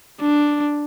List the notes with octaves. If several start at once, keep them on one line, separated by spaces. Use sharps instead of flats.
D4